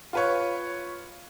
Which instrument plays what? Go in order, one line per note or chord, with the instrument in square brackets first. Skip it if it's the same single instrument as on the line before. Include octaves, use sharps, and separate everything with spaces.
[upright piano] F4 B4 C#5